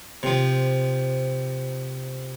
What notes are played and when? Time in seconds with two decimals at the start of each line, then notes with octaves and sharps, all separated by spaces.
0.23 C3 F3